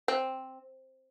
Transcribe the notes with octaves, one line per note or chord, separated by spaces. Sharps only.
C4